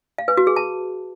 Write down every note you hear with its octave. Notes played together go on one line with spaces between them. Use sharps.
F5
B4
F#4
G#4
A5